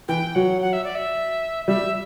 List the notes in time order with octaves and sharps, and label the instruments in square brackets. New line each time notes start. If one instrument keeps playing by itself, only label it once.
[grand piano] E3 [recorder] G5
[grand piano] F#3 [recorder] F#5
[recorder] F#5
E5
D5
E5
[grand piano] G3 [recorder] E5